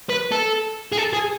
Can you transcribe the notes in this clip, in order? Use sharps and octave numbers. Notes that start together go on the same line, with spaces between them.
B4
A4
G#4
A4
G#4